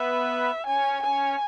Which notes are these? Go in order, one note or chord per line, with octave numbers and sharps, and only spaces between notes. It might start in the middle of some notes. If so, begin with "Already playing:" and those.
Already playing: B3 B4 E5
C#4 C#5 G#5
C#4 C#5 G#5